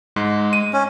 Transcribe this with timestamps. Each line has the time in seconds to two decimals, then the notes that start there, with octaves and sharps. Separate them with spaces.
0.16 G#2 G#3
0.53 D#7
0.73 C#4